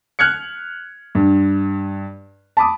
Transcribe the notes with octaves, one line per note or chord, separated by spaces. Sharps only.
F6 F#6 G#6 C#7
G2
A5 B5 D6 D#6